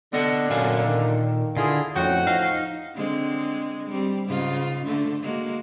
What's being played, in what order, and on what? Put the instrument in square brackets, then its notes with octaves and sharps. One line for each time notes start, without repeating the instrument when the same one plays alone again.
[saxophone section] D3 [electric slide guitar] B3 D#5 F#5
[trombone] F#2 [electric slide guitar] A#2 F5 G#5
[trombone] D#3
[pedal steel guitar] D3 [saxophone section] E4 F4 G#4
[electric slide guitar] F2 [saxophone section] A2 F#4 [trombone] C#4 [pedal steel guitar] G5
[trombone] F3 [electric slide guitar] D#4 [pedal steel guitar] F5
[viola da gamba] D3 G#3 C4
G3 C4
G#2 C#3 F4
D3 A3
G#3 A#3 F#4